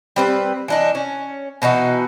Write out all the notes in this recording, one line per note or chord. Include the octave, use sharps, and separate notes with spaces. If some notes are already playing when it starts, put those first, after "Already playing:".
G3 C4 B4
E3 D4 D#4
C#4
B2 E3 D#4 F#4